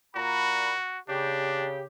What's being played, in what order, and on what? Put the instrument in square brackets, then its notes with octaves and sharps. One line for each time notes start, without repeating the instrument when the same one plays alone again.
[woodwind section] A#2 A#5 B5 [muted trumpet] F#4
[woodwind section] C#3 G4 [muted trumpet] D4